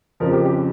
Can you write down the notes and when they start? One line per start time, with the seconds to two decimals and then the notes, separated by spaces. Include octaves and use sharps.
0.20 F2 C#3 F3 A#4
0.33 G4
0.45 G4